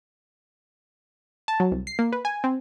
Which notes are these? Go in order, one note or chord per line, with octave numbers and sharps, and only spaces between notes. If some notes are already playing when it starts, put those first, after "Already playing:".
A5
F#3
C2
C7
A#3
B4
G#5
C4